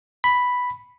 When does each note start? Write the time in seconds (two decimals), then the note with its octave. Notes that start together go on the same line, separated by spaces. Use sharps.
0.24 B5